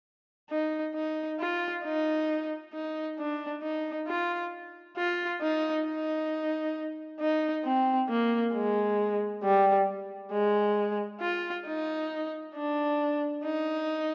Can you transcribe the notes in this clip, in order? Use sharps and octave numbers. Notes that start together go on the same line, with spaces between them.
D#4
D#4
F4
D#4
D#4
D4
D#4
F4
F4
D#4
D#4
D#4
C4
A#3
G#3
G3
G#3
F4
D#4
D4
D#4